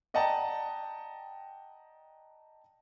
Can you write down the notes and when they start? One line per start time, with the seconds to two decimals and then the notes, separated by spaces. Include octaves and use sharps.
0.14 D5 D#5 F#5 G5 A5 A#5